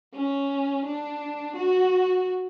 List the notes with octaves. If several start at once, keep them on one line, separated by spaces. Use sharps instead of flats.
C#4
D4
F#4